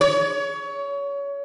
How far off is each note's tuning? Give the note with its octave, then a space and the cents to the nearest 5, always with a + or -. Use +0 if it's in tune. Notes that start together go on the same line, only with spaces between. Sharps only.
C#5 +25